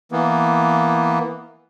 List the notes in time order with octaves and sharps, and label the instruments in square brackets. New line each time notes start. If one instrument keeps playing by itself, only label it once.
[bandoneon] E3 A#3 B3